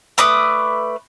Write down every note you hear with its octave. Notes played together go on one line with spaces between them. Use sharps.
A3 B4 D5 D#6